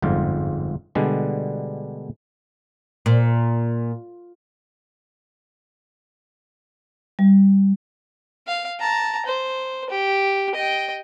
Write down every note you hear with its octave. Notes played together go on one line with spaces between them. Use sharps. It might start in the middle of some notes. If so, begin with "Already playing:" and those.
G1 F2 G#2 F4
B2 D3 G3 G#3 D4
A#2
G3
F5
A5 A#5
C5
G4
D#5 G5